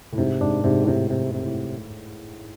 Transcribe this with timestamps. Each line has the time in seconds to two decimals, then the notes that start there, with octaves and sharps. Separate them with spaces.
0.12 A2
0.18 G#2 C3
0.41 G#2 D4
0.64 G#2 C3
0.83 A2
0.88 G#2 C3
1.10 C3
1.34 C3
1.41 A2